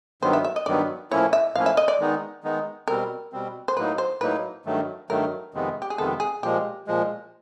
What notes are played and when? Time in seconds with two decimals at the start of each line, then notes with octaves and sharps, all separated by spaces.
0.22 G2 D#3 F#3 B3 C5
0.33 E5
0.45 E5
0.56 D#5
0.66 G2 D#3 F#3 B3 D5
1.11 A2 F3 A#3 C#4 E4 C#5
1.33 E5
1.55 A2 F3 A#3 C#4 E4 F5
1.66 E5
1.77 D#5
1.88 D5
2.00 D#3 G#3 B3 D#4
2.44 D#3 G#3 B3 D#4
2.88 B2 G3 C4 A#4
3.32 B2 G3 C4
3.68 C5
3.77 A2 F#3 A#3 D#4 B4
3.98 C5
4.21 A2 F#3 A#3 D#4 B4
4.65 G2 D#3 F#3 A3
5.10 G2 D#3 F#3 A3 A#4
5.54 F2 C3 D#3 G#3 B3
5.82 G4
5.90 G#4
5.98 F2 C3 D#3 G#3 B3 A4
6.20 G#4
6.43 A#2 F3 G#3 G4
6.87 A#2 F3 G#3